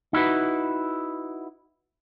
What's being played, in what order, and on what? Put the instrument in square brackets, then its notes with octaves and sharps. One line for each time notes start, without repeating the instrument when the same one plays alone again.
[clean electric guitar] D#4 E4 F#4 B4